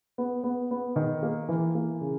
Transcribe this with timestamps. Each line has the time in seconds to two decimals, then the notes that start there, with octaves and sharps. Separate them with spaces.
0.18 B3
0.44 B3
0.71 B3
0.96 D#3
1.23 A#3
1.49 E3
1.75 A#3
2.01 C#3